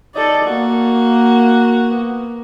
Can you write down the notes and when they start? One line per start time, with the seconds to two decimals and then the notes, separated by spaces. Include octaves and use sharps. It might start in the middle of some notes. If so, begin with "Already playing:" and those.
0.15 D#4 A4 D5
0.46 A#3 F#4
1.91 B3